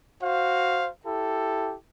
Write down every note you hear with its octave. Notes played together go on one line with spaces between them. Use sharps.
F#4 C5 F5
E4 G4 A4